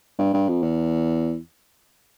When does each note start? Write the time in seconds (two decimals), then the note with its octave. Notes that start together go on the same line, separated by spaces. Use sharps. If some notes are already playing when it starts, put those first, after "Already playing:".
0.19 G2
0.34 G2
0.49 F2
0.63 E2